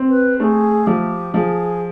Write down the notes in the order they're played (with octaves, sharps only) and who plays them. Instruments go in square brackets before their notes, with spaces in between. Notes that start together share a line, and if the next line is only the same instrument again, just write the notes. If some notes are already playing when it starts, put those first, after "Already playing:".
Already playing: [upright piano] C4
[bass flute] B4
[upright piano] A3 [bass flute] G#4
[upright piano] F3 [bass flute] G4
[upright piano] F3 [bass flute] G#4